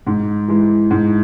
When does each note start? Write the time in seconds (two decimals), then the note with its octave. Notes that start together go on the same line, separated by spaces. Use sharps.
0.07 G#2
0.48 E3 G#3
0.91 G#2